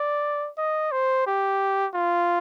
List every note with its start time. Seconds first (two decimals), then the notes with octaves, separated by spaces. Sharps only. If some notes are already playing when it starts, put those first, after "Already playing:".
Already playing: D5
0.58 D#5
0.92 C5
1.26 G4
1.94 F4